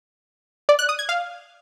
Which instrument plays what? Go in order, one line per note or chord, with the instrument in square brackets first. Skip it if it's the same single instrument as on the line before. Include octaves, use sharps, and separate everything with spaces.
[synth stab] D5
F#6
D#6
G#6
F5